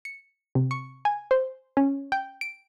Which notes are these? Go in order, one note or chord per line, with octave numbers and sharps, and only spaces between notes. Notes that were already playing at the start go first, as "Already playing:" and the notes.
C#7
C3
C#6
G#5
C5
C#4
G5
D7